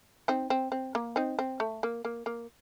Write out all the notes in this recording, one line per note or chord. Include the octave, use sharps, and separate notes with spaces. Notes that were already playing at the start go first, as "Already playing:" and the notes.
C4 D#4
C4
C4
A#3
C4 D#4
C4
A3
A#3
A#3
A#3